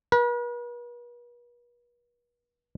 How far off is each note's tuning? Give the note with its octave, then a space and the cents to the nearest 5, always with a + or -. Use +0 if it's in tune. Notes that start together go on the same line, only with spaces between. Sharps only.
B4 -45